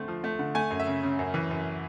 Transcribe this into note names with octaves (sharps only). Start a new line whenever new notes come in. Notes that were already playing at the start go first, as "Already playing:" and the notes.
Already playing: D3 A3 C4
F3
A3
D3
A3 G#5
F#2
E5
C#3
C#3
F#2
E3
F#2